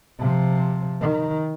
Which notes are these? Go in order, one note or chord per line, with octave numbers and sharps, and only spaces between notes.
C3 F3
D#3